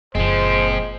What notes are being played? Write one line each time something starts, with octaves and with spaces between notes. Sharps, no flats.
F#1 A#2 F3 G#3 C4 C5